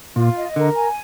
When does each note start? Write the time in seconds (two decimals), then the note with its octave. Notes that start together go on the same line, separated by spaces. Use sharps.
0.16 A#2 F4
0.36 D#5
0.56 D3 A#4
0.76 G#5